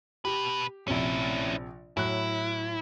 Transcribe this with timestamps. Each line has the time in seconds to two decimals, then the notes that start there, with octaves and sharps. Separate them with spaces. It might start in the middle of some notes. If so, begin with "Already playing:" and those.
0.25 B2 G4 B4
0.88 A#1 C3 C#4 E4
1.97 A2 F#3 E4 F#6